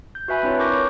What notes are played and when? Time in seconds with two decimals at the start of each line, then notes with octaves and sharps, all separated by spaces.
0.15 G6
0.28 F#4 B4 E5 G#5 B5
0.43 C4 D4 E4 F4 B4 C#5
0.59 A#4 C#6 D6 G6 A#6
0.72 C#5